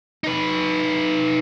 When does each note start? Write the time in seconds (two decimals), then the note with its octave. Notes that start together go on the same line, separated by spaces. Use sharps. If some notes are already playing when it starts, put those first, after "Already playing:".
0.24 D#4 B4